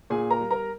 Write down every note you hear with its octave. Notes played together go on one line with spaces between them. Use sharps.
A#2 G#4 G#5
A#4 A#5
G3
A#4 A#5